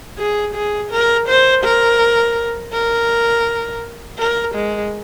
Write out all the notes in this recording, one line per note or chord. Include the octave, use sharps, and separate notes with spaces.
G#4
G#4
A#4
C5
A#4
A#4
A#4
G#3